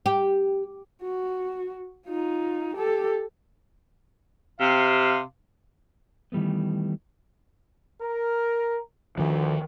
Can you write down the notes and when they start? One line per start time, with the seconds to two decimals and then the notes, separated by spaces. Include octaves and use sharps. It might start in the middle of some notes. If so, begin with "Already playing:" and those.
0.06 G4
1.02 F#4
2.07 D#4 F4
2.76 G4 A4
4.60 C3 F5
6.32 D#3 E3 G3 A3 B3
8.01 A#4
9.18 D2 D#3 F3